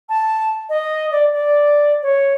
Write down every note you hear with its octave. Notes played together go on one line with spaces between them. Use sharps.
A5
D#5
D5
D5
C#5